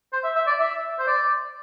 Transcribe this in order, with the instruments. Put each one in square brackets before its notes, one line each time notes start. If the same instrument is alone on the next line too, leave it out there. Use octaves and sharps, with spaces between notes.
[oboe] C5
E5
E5
D5
E5
C5
D5